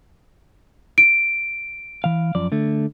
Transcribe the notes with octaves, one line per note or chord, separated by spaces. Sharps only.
D7
E3 F5
F#2 F3 D5
D3 A3